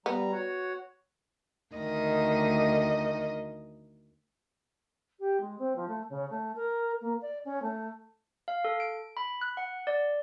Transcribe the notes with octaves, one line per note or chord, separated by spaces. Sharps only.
G3 B3 A#5
F#4 C#5 F#5
D2 D#3 D#5
G4
G#3
C4
F3
A3
C#3
A3
A#4
A#3
D5
C#4
A3
F5
A4
D7
B5
F#6
F#5
D5